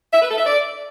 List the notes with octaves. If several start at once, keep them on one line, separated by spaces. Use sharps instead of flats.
E5
B4
A4
E5
D5